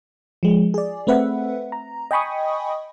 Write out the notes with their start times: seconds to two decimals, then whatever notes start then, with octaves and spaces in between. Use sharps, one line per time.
0.43 F3 G#3
0.74 G#4 D5
1.07 A3 C4 B4 E5 F#5
1.72 A#5
2.11 D#5 G5 G#5 B5 C#6 D#6